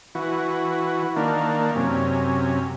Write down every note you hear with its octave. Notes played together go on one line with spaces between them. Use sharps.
E3 F#4
D#3 A#3 D4
F#2 C3 C#4